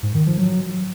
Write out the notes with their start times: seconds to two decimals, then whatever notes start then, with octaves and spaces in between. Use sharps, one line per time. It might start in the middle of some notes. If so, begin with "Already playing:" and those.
0.03 G#2
0.14 D#3
0.26 F3
0.38 F#3